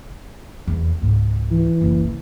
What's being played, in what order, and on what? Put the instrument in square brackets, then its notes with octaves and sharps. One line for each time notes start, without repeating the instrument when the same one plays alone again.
[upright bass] F1 E2
C#2 G#2
[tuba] E3
[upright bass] F#1 C2